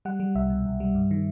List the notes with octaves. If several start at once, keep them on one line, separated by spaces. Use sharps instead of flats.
G3 F#5
G3
C2 E5
B2
C2
G3
G2
D#3